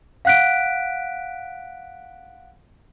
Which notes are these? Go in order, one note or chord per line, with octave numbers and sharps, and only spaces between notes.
F5 F#5 F#6 B6 D7